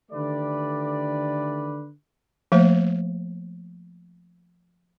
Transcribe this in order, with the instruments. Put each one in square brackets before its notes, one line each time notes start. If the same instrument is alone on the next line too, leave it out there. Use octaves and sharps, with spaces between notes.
[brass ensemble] D3 D#3 A3 G4 B4 D5
[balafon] F3 A3 A#3 C5